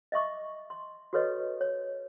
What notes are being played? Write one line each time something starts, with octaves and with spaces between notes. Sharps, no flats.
D#5 E5 C#6 D6
C6
F#4 G4 A4 B4 C#5 D#5
C#5